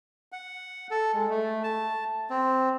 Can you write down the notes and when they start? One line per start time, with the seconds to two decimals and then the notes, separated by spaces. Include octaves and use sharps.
0.32 F#5
0.91 A4
1.14 G#3
1.29 A3
1.64 A5
2.30 C4